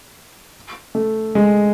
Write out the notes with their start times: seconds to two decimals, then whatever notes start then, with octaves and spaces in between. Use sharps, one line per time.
0.95 A3
1.35 G#3